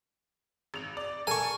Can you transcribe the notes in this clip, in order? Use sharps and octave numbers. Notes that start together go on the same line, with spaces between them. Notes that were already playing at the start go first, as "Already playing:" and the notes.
G#1 F7
D5
A4 A#4 G#5 A5 C#6